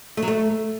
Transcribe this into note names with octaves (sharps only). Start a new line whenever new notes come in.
A3
F#3
A3